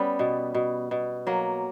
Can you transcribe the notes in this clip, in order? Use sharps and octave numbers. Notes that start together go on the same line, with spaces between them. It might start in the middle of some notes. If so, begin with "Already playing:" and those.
Already playing: G3 B3 C#4
B2
B2
B2
F#3 A#3